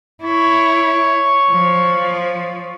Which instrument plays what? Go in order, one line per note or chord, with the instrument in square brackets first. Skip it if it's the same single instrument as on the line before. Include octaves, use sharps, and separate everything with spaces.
[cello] E4 [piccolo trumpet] C#5
[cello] F3